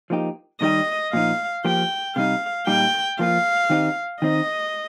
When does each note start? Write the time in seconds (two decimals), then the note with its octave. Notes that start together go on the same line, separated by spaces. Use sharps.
0.10 F3 A#3 D#4 G4
0.61 D#3 G3 D#4 G4 D#5
1.13 A#2 F3 D#4 F5
1.65 F3 A#3 G4 G5
2.16 C3 G3 D#4 F5
2.67 A#2 G3 D#4 G4 G5
3.19 F3 A#3 F4 F5
3.70 D#3 C4 D#4 G4
4.22 D#3 C4 D#4 D#5